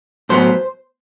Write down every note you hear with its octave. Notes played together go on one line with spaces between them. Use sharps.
A2 F#3 B3 C5